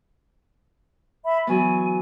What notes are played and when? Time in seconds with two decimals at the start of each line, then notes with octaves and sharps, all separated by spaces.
1.24 E5 B5
1.47 E3 F#3 B3 G#5